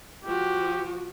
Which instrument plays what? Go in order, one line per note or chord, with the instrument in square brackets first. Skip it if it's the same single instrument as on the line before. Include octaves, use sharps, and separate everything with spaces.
[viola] F3 F#4 [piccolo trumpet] G4